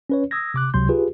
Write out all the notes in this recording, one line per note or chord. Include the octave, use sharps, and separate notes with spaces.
C#4 B4 C#5
D#6 E6 G#6 A#6
C3 D6 F#6
C#2 C3 F#3 C6 G6
F4 G4 G#4 B4